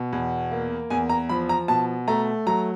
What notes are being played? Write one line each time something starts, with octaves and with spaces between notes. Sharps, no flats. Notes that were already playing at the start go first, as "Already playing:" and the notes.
Already playing: B2
E2
A#3
E2 G#5
A#5
F3 B5
A#5
B2 A5
A3 A#5
F#3 A#5